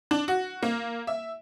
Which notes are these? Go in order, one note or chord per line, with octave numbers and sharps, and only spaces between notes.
D4
F#4
A#3
E5